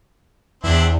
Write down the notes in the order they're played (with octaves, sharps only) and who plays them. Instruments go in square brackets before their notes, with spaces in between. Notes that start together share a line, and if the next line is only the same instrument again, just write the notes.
[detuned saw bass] E2 [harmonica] C4 D4 E4